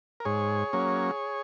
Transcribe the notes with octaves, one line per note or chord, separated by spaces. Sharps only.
A#4
G#2 G#4 C#5
F#3 A#3 C#4